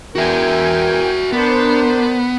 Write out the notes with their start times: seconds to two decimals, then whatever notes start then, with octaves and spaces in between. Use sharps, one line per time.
0.15 E2 F#4 A#4 E5 G5 G#5
1.33 B3 D4 A#4 C5